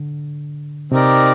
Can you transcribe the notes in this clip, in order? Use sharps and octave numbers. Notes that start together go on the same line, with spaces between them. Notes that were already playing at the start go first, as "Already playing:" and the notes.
Already playing: D3
C3 C4 D#4 G4 A#4 D5